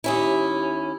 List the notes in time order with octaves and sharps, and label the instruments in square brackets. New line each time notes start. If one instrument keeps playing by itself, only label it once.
[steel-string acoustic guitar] D#2 C#4 E4